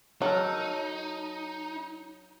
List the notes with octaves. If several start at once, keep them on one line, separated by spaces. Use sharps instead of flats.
F#3 D#4 A4 A#4